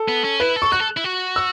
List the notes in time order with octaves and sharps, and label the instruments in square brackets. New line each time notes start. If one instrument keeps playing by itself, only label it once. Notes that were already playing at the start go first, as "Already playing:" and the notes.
Already playing: [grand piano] A4
[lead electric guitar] B3
C#4
[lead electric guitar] E4 [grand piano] B4
[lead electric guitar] A4
[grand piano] C#6
[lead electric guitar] F#4 [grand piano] F#6
[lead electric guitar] A4
E4
F#4
[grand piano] E6